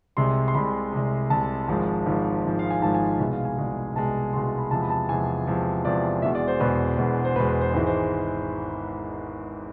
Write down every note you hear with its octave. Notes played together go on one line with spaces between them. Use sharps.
C2 C3 G#3 C6
C6
C2 C3 G#3 B5
C2 C3 G#3
C2 C3 G#3 A5
G#1 G#2 F3 G#3
G#1 G#2 F3 G#3
G#1 G#2 F3 G#3
F5
G#5
G#1 G#2 F3 G#3 A5
G#5
F5
C2 B2 G#3 E5
F5
G#5
C2 B2 G#3
C2 B2 G#3 A5
C2 B2 G#3 C6
B5
E2 C3 F3 G#3 A5
B5
A5
E2 C3 F3 G#3 G#5
E2 C3 F3 G#3
E2 C3 F3 G#3 D5
E1 E2 B2 G#3 E5
D5
C5
E1 E2 B2 G#3 B4
E1 E2 B2 G#3
C5
E1 E2 B2 G#3 B4
B4
C5
G#1 G#2 E3 G#3 C5
C5